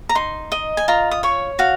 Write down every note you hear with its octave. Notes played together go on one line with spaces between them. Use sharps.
A#5
D#4 C6
D#5
G#5
F4 A#5
D#6
C#5 C#6
F#4 F5